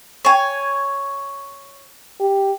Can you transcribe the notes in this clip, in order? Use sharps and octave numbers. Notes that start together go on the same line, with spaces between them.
C#5 G#5
G4